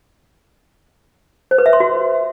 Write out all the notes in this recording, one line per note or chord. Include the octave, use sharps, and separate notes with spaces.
C5
B4
E5
C6
F#4